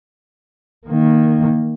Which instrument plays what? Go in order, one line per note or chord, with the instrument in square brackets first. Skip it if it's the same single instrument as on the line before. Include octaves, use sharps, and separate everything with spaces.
[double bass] D#3 A#3